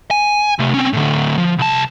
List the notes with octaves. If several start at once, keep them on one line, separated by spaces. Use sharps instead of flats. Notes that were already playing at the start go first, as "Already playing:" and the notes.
G#5
C3 A3
C4 C#4
A2 D3
F3
C2 A5